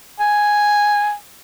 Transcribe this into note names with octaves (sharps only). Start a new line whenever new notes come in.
G#5